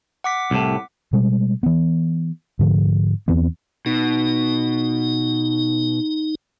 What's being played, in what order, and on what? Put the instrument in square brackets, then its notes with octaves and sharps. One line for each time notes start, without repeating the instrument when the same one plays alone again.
[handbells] F#5 D6 B6
[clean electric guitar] C2 A2
[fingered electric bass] B2 G3 G#3
E3 B3
G#2 D3 F3
E2 E3 B3 C4
[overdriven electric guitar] B2 [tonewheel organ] D#4